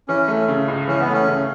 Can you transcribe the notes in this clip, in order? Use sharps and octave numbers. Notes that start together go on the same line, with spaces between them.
E3 C#4
A3
C#3
C#2
E3 C#4
B3
A3
C#4
C#3